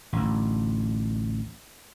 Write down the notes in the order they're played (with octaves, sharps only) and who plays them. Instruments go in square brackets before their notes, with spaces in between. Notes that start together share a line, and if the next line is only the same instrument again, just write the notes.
[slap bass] A1 D2